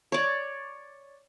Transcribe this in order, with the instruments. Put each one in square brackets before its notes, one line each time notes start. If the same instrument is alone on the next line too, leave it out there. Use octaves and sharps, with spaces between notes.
[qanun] C#5 D5